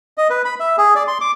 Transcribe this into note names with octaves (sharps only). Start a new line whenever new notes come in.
D#5
B4
B5
E5
G#4
D5
C6
D6